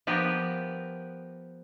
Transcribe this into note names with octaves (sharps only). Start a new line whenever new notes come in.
F3 B3 G4 A#4